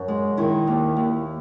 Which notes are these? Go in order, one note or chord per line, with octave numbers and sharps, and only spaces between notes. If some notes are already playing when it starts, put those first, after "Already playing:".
Already playing: F#2
G#3
D#3 E4
D#2
D#2